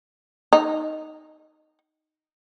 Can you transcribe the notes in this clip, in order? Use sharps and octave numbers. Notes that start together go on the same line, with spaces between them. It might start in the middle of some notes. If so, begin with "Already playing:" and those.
D#4